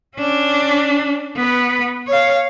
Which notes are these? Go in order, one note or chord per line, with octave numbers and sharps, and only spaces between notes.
C#4 D4
B3 B4
C#5 F5